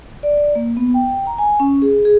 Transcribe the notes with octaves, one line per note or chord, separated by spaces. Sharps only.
D5
A#3
B3
G5
A#5
G#5
C#4
G#4
G#4